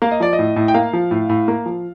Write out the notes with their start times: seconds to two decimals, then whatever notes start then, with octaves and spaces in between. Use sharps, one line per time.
0.02 A#3 F5
0.11 D#5
0.20 F3 D5
0.33 D#5
0.39 A2
0.56 A2
0.68 G5
0.74 A#3 F5
0.93 F3
1.11 A2
1.29 A2
1.48 A#3
1.66 F3